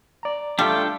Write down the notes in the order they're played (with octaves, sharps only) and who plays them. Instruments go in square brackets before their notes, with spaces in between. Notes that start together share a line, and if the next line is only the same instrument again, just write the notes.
[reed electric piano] D5 A#5
[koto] G3 [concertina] A3 F4 [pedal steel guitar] D4 A4 G5